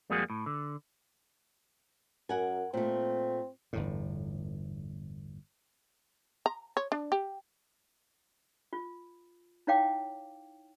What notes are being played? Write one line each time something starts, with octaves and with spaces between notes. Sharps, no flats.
F2 G3 G#3 A#3 F#4 G#4
A2
D3
F#2 A#4 F#5 G#5
A#2 A3 C4
G1 E2 A2
A#5
C#5
D4
G4
F4
D#4 E4 C#5 F5 G5 D6